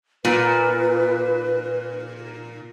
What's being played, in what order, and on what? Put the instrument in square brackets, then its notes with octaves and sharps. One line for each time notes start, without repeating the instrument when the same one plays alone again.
[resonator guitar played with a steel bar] A#2 [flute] B4